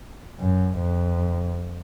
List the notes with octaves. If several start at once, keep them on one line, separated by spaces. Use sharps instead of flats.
F#2
F2